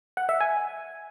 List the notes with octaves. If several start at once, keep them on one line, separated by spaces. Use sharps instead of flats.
F#5
E5
G#5